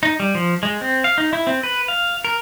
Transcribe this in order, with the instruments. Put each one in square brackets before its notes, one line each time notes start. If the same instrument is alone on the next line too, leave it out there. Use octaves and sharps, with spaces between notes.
[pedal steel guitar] D#4
G3
F3
G#3
C4
F5
D#4
E4
C4
B4
F5
A#4